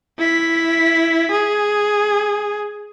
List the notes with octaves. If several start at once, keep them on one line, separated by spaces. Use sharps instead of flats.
E4 B6
G#4